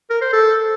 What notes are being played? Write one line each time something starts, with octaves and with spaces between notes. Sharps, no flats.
A#4
C5
A4